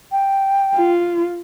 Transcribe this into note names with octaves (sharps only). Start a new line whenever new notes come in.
G5
F4